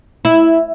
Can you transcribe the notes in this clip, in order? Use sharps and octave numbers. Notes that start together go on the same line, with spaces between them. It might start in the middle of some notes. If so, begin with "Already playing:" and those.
E4